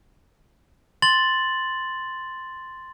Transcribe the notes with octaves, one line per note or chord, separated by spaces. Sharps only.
C6 A6 F#7